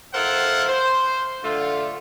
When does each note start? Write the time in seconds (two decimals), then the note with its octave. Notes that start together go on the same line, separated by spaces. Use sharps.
0.14 E4 A4 A#4 C5 F5 F#5
0.68 C5
1.44 D3 A3 F4